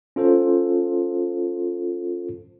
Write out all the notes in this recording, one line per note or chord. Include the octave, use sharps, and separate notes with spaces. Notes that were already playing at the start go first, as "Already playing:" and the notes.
C#4 F4 A4 C5